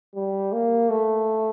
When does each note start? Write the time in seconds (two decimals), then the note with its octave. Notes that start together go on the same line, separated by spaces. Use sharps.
0.15 G3
0.52 A#3
0.89 A3